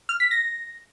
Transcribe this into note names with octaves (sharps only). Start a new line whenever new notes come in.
F6
B6
A#6